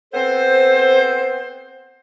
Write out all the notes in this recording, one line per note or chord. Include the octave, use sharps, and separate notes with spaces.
B3 C4 A4 C5